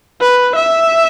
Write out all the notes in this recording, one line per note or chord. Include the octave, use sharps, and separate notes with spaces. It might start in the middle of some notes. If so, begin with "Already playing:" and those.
B4
E5